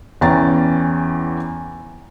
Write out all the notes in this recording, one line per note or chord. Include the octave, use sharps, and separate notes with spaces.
E2 E3 C#4 G5 A#5 A6